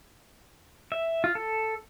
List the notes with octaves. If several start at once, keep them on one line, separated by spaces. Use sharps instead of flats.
E5
F4
A4